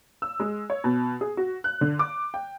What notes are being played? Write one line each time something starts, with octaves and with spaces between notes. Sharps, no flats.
E6
G#3
C#5
B2
G#4
F#4
F#6
D3
D6
G5